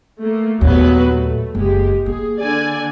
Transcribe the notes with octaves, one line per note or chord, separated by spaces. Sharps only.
A3 A#3
D#2 A#2 F#3 B3 B4
A3
F#1 G#3 G4
A#3 G#4
D3 D5 G#5